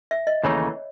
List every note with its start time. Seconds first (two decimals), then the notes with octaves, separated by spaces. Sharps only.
0.11 E5
0.27 D#5
0.44 D#2 C#3 E3 A3 D#4 C#5